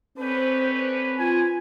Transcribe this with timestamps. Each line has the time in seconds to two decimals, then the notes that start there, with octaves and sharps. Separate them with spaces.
0.17 D3 C4 C#4 B4 C5
1.19 F4 G#5